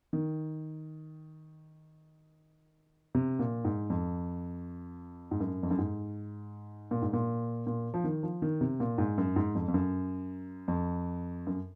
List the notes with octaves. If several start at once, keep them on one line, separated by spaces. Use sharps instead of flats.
D#3
C3
A#2
G#2
F2
G#2
F#2
F2
F#2
G#2
A#2
G#2
A#2
A#2
F3
D#3
F3
D#3
C3
A#2
G#2
F#2
G#2
F2
F2
F#2
F2
F#2